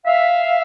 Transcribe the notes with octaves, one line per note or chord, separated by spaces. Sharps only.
E5 F5